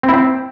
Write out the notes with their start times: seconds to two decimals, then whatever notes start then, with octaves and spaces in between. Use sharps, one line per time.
0.03 C4
0.08 E4
0.14 C4